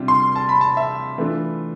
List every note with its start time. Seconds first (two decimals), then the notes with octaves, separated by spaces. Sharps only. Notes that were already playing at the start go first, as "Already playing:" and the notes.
Already playing: C3 G3 D4 F4
0.08 C6
0.35 A5
0.49 B5
0.61 A5
0.77 E5
1.18 E3 A3 D4 F4